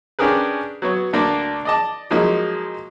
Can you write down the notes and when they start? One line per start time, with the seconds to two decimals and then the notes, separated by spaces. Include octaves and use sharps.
0.19 C#4 D4 G4 G#4 A#4 B4
0.82 F#3 B3 C#5
1.13 D2 A#3 D4
1.65 D5 D#5 A5
2.10 F3 F#3 G#3 A#3 D#4